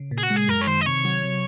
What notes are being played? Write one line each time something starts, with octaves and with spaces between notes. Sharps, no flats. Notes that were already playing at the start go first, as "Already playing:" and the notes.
Already playing: C#3
A#2
G#4
F#4
G#3
G#4
F#2 A#4
C#5
D#3 C5
D#5
C3 C#5
F#3
C3